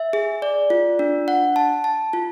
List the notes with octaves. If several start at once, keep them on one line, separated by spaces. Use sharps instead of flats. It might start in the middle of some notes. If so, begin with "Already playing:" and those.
Already playing: E5
G#4
D5
F4
D4
F#5
A5
A5
F4